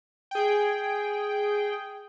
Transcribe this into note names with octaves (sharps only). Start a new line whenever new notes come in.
G#4 G5